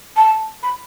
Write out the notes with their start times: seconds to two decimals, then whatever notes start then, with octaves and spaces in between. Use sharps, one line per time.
0.16 A5
0.63 B5